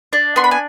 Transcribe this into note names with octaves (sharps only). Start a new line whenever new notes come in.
D4
B3 C6
B5
G#5